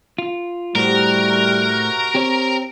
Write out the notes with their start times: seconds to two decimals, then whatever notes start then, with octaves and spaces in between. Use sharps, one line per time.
0.18 F4
0.75 A2 C3 G3 F#4 A#4
2.15 C4 G4 C#5